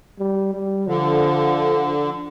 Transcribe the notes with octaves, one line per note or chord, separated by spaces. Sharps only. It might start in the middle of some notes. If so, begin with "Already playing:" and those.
G3
G3
D3 F3